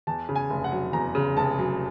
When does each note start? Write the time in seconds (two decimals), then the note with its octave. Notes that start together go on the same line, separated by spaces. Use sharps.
0.07 E2 A5
0.29 C#3
0.36 G#5
0.50 F1
0.64 F#5
0.72 F#3
0.93 E2 A#5
1.15 C#3
1.37 F1 A5
1.58 F#3